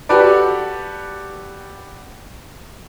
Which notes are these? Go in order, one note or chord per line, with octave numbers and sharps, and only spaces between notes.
F#4 G4 A4 B4 D5